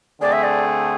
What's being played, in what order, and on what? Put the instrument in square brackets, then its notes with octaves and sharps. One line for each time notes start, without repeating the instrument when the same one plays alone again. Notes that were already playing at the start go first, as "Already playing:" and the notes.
[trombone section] D3 A3 C4 G#4 [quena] D5
[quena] E5
D5